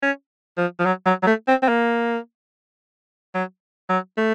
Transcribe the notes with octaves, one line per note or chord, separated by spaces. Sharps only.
C#4
F3
F3
F#3
F#3
F#3
A3
C4
C4
A#3
F#3
F#3
A3